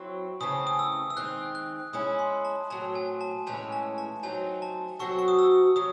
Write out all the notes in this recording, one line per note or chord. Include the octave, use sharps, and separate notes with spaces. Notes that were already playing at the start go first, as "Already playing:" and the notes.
Already playing: F#3 C4 E4 C#6
C#3 E3 A3 C4 D#6
D#6
E6
E6
D#3 G#3 C4 F#6
F#6
G#3 C#4 E4 D#6
C6
A5
A2 F#3 C4 A5
G#5
A5
A2 E3 G#3 C#4 G#5
A5
A5
F#3 A3 C4 D#4 G#5
A5
F#3 C4 F#4 A4 C#6
C#6
D#6
E6
F#3 D#6